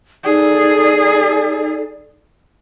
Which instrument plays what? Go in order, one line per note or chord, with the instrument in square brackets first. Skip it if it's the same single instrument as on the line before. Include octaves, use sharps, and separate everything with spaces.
[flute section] D#4 A4 D5 [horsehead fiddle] G#4